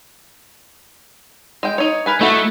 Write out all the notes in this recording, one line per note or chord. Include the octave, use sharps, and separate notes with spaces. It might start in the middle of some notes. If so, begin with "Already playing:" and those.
G#3 G5
D#4 C#5
A#4 B4 G#5
A3 D#4 E4 F#4